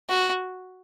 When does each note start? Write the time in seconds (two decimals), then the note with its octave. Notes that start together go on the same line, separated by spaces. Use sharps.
0.09 F#4